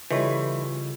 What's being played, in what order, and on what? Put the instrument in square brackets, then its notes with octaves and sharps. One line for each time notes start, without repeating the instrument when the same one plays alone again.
[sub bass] C#3 [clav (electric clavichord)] E3 [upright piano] G3 C#5 D#5 [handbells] F4 A4 C#6